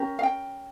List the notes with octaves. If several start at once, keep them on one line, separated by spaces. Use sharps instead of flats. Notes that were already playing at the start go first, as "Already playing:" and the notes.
Already playing: C#4 G4 A#4
F5
G5